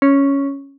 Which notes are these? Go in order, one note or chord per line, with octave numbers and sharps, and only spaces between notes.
C#4